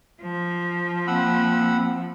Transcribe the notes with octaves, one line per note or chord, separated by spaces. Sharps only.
F3
A#3 C4 F#5 B5 E6